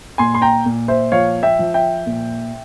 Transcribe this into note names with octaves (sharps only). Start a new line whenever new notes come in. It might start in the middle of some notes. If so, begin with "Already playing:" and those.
A#2 G#5 C6
C6
G5 A#5
A#2
C5 E5
F3 C#5 F5
E5 G5
F3
E5 G5
A#2